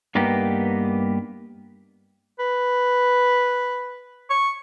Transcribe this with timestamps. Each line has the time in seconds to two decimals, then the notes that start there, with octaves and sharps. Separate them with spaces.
0.15 G2 A#3 B3 D#4 G4
2.39 B4
4.30 C#6